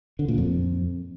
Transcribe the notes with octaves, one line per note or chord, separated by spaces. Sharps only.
D3
A#2
F2